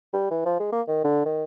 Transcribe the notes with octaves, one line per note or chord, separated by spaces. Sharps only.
G3
E3
F3
G#3
A#3
D#3
D3
D#3